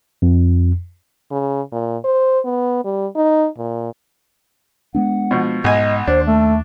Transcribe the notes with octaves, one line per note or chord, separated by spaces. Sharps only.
F2
C#3
A#2
C5
B3
G3
D#4
A#2
G#3 B3 D4 F#5
B2 F3
B1 G#2 D#5 G#5
D#2 D4 C5
A3 A4